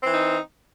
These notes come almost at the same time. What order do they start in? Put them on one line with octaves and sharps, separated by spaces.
C4 E3 D#4